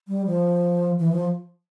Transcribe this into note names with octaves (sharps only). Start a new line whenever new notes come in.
G3
F3
E3
F3